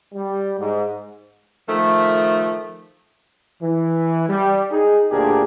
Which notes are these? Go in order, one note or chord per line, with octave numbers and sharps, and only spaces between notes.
G3
G#2
D#3 F3 A3
E3
G3
D#4 G#4
D2 A#2 D4 G4 G#4 A#4